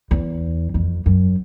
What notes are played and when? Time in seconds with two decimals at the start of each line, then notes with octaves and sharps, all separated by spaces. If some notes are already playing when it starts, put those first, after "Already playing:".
0.11 E2
0.74 F2
1.06 F#2